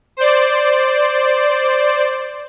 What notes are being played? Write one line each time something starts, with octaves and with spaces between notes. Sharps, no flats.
C5 D5